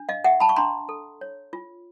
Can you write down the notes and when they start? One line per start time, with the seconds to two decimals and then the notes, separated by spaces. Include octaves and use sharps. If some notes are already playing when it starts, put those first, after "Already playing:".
Already playing: D4
0.09 D#5 F5
0.24 G4 E5 F#5
0.40 A5 B5
0.49 C#6
0.56 D4 A#5 C6
0.89 A4
1.21 C#5
1.53 F4